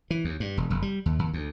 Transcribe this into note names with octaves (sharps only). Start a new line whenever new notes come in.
E3
D#2
G2
E1
F1
G3
D#2
D#2
D2